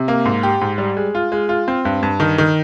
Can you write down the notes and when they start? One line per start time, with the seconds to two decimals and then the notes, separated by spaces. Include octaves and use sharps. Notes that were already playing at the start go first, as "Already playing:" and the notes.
Already playing: C3
0.08 A#3
0.25 G#2
0.43 G4
0.61 G#2
0.78 G3
0.97 G#3
1.15 F4
1.32 G#3
1.49 F4
1.68 C4
1.85 G2
2.03 G2
2.20 D#3
2.38 D#3